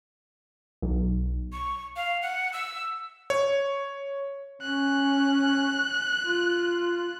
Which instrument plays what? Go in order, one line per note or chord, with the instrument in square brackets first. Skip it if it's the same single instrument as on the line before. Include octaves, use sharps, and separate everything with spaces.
[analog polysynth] B1
[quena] C#6
F5
F#5
E6
[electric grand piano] C#5
[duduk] C#4 [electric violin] F#6
[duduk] F4